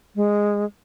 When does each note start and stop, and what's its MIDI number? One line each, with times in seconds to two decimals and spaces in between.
0.16 0.65 56